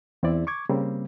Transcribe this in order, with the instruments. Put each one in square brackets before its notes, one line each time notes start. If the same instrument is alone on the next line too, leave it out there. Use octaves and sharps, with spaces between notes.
[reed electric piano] E2 C4 E4 D5
C#6 D6 G#6
C#3 G3 A#3 C4